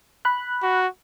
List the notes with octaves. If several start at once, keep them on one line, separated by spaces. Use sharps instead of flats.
B5 F#6
F#4